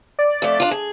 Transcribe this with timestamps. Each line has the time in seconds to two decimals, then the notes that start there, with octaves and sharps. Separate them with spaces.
0.19 D5
0.42 F2 A3
0.60 D4 F4
0.71 G#4